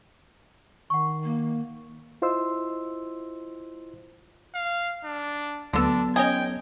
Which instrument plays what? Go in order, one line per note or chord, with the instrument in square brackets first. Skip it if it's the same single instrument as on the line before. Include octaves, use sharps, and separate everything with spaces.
[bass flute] D#3 [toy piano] F#5 C#6
[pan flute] A#3
[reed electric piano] E4 F4 C5 D#5 C6 E6
[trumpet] F5
D4
[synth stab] D2 [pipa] D3 A4 [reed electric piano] F#3 B3 [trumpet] D4
[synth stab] C#4 D#4 D#5 [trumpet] G5 [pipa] G#5